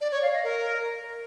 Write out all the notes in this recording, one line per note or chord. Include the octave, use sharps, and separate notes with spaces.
D5
C#5
F5
D#5
A#4